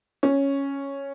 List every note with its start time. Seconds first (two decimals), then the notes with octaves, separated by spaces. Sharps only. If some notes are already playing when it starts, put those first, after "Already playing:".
0.23 C#4